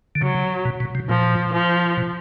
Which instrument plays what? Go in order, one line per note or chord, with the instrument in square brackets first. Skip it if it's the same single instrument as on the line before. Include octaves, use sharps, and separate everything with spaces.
[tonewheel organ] D3
[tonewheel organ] C#3 [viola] F#3
[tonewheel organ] B2
B2
C3
[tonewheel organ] A#2 [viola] F3
[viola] F3
[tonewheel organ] B2